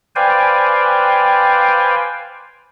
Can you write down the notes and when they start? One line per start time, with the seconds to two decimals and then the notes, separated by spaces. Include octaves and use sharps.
0.16 B4 C5 D5 F5 G5 G#5